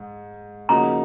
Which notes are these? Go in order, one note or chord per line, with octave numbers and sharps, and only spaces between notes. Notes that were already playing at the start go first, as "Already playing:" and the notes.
Already playing: G#2
C#3 F3 A#3 D#4 F#4 A#5